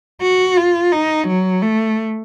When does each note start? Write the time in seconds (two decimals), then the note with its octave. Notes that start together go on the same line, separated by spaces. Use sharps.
0.22 F#4
0.57 F4
0.92 D#4
1.28 F#3
1.62 A3